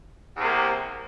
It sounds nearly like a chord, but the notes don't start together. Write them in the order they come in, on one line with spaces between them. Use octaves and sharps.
E2 C3 A#3